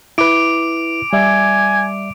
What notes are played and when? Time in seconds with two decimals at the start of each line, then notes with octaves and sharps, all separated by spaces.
0.18 E4 B4 D6 D7
1.13 G3 D5 E5 G#5